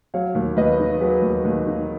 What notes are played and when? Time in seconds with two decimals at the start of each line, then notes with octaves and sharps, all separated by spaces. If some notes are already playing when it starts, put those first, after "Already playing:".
0.14 F#3 C#5 F5
0.35 D#2
0.56 D#2 B4 D#5
0.79 D#3
1.00 F#3 G#4 B4
1.22 D#2
1.45 D#2
1.67 D#3